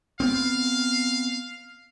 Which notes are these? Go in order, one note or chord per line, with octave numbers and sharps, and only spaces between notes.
B3 C4 F5